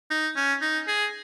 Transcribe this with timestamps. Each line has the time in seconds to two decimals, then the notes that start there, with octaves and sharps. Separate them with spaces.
0.10 D#4
0.36 C#4
0.61 D#4
0.88 G#4